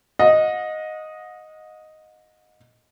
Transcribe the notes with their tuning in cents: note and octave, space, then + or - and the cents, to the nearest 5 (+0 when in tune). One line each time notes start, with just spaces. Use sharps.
D#5 +0 F#5 -40